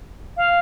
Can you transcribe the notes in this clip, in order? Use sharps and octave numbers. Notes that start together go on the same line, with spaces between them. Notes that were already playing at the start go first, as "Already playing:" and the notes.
F5